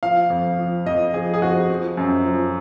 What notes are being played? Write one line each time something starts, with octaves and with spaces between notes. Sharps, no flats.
F3 F5
F2
F3
F2 D#5
F3 G#4
G#4
F2 F#4
F3
F#2
F3